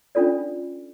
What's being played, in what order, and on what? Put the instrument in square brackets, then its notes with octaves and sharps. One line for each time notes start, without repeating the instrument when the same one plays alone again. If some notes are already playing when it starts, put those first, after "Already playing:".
[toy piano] C#4 D4 F4 A4 D5